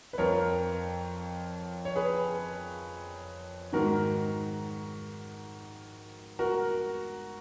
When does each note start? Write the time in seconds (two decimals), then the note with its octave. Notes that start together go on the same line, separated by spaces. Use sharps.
0.13 B4
0.18 F2 F3 A#4 C#5
1.85 C#5
1.96 G#4 B4
3.73 G#2 D#3 F#4 A#4
6.39 F#4 A#4